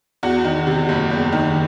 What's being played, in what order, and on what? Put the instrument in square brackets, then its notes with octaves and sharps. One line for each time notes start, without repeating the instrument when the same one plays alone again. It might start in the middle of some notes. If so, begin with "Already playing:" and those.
[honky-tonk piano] E2 F#4
D#3
C3
F#1
E2
D#3